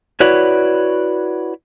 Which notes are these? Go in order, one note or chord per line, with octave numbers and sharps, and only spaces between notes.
E4 F#4 B4 C#5 D5